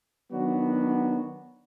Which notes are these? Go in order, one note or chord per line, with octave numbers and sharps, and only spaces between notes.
D#3 F#3 B3 D4 F#4